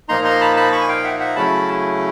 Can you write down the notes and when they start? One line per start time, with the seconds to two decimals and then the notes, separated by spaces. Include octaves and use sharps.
0.09 A#2 F3 A#3 D#4 A#5 C6
0.24 A#5 C6
0.41 A5 B5
0.56 A5 B5
0.72 B5 C#6
0.81 G#5
0.89 F5 G5
1.04 E5 F#5
1.20 E5 F#5
1.36 C#3 F#3 A3 C#4 E4 A5 B5